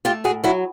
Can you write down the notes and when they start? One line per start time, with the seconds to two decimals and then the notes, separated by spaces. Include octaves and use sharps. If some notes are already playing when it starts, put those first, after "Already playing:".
0.05 A3 F4 G4
0.24 A2 F#4 G#4
0.44 F#3 E4 F#4